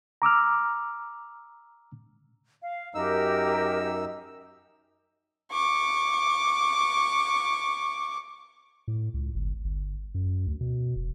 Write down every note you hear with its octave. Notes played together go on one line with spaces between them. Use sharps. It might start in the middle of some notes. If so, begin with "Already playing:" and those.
A#5 D6 E6 F6
F5
F#2 D#4 G4 A#4 E6
C#6 D6
A2
C#2
G1
G1
F#2
D2
B2
E1